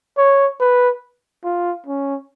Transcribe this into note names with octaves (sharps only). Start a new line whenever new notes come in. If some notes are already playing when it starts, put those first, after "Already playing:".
C#5
B4
F4
C#4